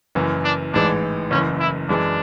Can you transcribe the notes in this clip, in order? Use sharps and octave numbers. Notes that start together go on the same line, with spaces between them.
F#1 F#2 E3
D4
A1 G#2 E3 G#3 D4
F#1 F#2 E3 C#4
E4
F#2 E3 G#3 D4